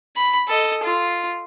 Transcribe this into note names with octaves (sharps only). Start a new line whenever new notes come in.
B5
A4 D#5
F4